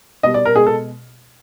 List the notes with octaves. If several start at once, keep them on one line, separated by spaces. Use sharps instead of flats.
B2 G3 D#5
D5
A#4
B2 G#3 G#4
A4